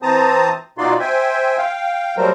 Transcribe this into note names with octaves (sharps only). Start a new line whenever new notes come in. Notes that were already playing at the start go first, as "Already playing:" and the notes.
E3 C4 C5 A5 A#5 D#6
B2 D#4 F4 F#4 D5 C6
C5 E5 G5 G#5
F5 G5
F#3 G3 A3 A#4 C5